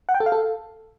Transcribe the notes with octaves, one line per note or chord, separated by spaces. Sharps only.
F#5
G5
A4
F5
A4